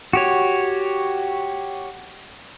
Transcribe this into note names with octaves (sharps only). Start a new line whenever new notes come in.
F#4 G4 C#5